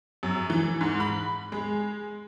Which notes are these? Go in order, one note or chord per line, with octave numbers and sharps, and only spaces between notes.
F#2
E3
G#2
B5
G#3